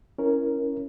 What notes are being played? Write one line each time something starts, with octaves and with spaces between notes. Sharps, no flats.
C#4 E4 A#4